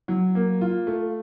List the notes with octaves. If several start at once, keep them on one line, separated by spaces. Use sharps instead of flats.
F#3
A#3
F4
A3